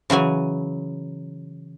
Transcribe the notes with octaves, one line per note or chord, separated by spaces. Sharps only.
C#3 E3 F#3 G#5